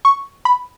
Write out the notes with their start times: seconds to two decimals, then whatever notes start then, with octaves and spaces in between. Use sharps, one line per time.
0.05 C#6
0.45 B5